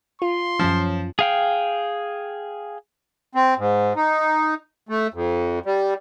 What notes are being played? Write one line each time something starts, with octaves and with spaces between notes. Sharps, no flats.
F4 C6
F#2 F3 C#4
G#4 F5 G5
C4
G#2
D#4
A3
F2
G3